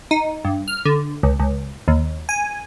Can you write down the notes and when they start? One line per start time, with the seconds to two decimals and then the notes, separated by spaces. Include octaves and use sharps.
0.11 D#4
0.45 G2
0.68 F6
0.85 D3
1.23 C#2
1.40 C#2
1.88 D#2
2.29 G#5